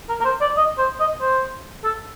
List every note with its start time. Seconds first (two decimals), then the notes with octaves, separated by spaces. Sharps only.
0.09 A#4
0.20 A#4
0.25 C5
0.41 D5
0.57 D#5
0.78 C5
1.00 D#5
1.21 C5
1.84 A4